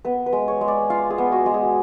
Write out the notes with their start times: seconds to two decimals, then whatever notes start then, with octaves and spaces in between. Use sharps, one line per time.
0.05 B3 B4
0.26 B4
0.33 G#3
0.48 C#5
0.61 G#3
0.68 D5
0.90 F4 F5
1.10 G#4
1.18 B3
1.32 F#4
1.46 G#3
1.54 G#4